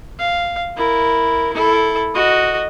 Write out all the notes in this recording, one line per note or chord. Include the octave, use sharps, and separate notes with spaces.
F5
E4 A#4
E4 A4
F#4 D#5